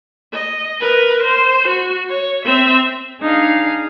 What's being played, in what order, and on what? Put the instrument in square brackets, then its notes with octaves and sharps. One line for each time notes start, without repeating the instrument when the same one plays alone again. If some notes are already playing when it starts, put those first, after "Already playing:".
[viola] D#5
A#4 B4
C5
F#4
C#5
C4 E5
[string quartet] D4 D#4 G#4 F5